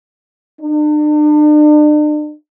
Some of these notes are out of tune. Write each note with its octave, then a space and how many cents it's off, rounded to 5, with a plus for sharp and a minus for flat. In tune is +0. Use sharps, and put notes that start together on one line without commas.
D4 +40